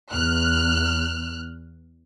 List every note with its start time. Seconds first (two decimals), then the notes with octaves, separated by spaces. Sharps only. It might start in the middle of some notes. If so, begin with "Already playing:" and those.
0.12 E2 F6 F#6